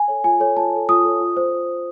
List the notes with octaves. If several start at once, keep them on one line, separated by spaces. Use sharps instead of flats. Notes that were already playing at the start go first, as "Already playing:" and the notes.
Already playing: G#5
A4 C#5
F4 G#5
A4 C#5
F4 A5
A4 C#5
F4 D#6
A4 C#5
F4
C5